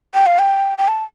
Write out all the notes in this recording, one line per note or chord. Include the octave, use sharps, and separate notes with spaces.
G5
F5
G5
G5
A5